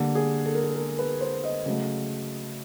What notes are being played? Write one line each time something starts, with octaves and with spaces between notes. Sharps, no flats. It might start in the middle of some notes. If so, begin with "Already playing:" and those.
Already playing: D3 G3 A#3
G#4
A4
A#4
A4
A#4
B4
C5
D#5
C#3 F#3 A3